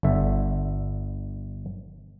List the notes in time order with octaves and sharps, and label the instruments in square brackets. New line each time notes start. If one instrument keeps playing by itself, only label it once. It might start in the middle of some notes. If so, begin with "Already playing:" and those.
[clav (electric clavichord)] G1 D3 E5